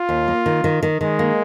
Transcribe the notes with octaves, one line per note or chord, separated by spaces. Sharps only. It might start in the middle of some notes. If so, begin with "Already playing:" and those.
Already playing: F4
D#2
A#3
D#3
D#3
D#3
D#3 G#3
A#3